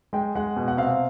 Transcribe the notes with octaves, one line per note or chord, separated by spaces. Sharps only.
G#3 G5
G#3 F#5
B2
F#5
C3 F5